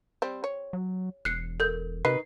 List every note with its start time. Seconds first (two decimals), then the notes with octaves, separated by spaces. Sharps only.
0.22 G3 C4
0.44 C#5
0.73 F#3
1.25 E1 F#6 C7 C#7
1.60 A4 A#4 G6
2.05 C3 D#3 B4 D#5 C7